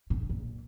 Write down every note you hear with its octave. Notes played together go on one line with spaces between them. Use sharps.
A2
A#2